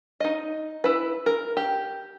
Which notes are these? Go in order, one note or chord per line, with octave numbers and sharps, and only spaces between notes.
D#4 D#5
E4 B4
A#4
G4